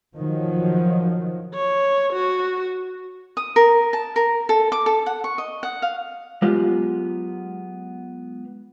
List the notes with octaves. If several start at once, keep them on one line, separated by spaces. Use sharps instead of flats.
D#3 F3 F#3
C#5
F#4
D#6
A#4
A5
A#4
A4
D6
A4
F#5
C#6
D#5
F#5
F5
F#3 G#3 B3 F4 G4